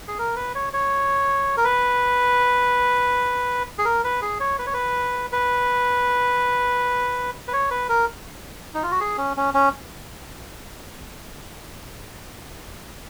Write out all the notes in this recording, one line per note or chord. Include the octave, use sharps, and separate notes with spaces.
G#4
A#4
B4
C#5
C#5
A#4
B4
G#4
A#4
B4
G#4
C#5
B4
C#5
B4
B4
B4
C#5
B4
A#4
D#4
F4
F#4
G#4
C#4
C#4
C#4